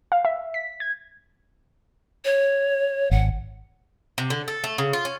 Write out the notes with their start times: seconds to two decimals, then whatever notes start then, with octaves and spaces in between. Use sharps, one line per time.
0.12 F5
0.25 E5
0.54 B6
0.80 G#6
2.25 C#5
3.11 G#1 F#5
4.18 C3
4.30 D3
4.48 A4
4.64 A3
4.78 C#3
4.93 F4
5.05 C#4